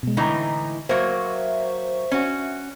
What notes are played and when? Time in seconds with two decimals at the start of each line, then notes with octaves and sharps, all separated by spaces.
0.03 B2 G#3
0.17 A2 D3 E3 D#4 A#5
0.89 F#3 A#3 C5 E5 C#6
2.11 C#4 F#4